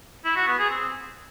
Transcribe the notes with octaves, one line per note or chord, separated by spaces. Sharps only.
E4
F#4
B3
G#4
C4